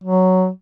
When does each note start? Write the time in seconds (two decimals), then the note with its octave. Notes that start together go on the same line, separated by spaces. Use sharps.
0.04 F#3